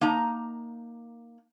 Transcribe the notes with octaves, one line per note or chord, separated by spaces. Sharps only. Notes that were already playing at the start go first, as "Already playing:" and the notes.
A#3 D#4 A#5